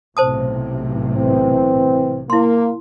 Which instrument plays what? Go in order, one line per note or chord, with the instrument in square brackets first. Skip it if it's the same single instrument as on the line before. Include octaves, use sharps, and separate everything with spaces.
[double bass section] B1 A2 C3 [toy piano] C5 A5 D#6
[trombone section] E3 C4
[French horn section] A#3 [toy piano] E4 C6